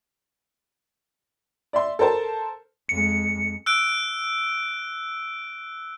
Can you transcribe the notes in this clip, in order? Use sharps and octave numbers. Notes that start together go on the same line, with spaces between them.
D5 E5 C6
A4 A#4 C5 A5
F2 G#3 C#7
E6 F#6 D7